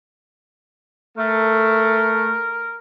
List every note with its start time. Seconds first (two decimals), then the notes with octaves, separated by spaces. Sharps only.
1.18 A3 A#4